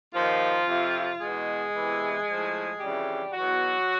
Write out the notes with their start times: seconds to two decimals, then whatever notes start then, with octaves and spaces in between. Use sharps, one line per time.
0.14 D#2 D#3 F3 F4
0.67 F2 C3 F3
1.20 E2 B2 G#3 G#4
1.73 E2 C3 E3
2.26 A2 F3
2.79 F2 C#3 E3 G3 G4
3.32 E2 B2 F#3 F#4